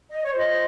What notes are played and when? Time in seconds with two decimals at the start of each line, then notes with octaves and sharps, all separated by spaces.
0.10 D#5
0.23 C#5
0.32 F4 G#4 C5 D#5